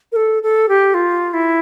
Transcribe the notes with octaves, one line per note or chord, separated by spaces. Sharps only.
A#4
A4
A4
G4
F4
E4